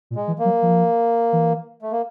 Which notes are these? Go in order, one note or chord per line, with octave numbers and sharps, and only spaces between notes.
A#2
G#3
E3
A#3
F#3
F3
E3
A3
A#3